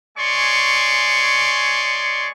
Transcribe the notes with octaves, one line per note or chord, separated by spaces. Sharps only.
G#3 C#5 D5 G#5 C6 C#6